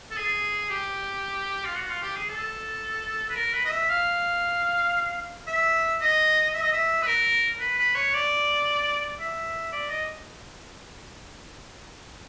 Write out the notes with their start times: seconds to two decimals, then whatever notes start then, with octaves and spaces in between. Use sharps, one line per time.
0.11 A4
0.17 G#4
0.70 G4
1.65 F4
1.76 F#4
1.90 F4
2.02 G4
2.16 G#4
2.30 A4
3.30 B4
3.35 A#4
3.53 B4
3.65 D#5
3.71 E5
3.89 F5
5.47 E5
6.01 D#5
6.54 E5
6.63 D#5
6.73 E5
7.02 B4
7.07 A#4
7.60 B4
7.79 B4
7.95 C#5
8.14 D5
9.20 E5
9.72 D5
9.90 D#5